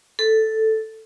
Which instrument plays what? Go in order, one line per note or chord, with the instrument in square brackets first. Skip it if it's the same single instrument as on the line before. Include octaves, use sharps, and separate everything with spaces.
[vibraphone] A4